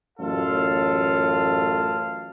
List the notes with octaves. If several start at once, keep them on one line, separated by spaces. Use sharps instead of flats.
A1 F#2 F4 A4 F5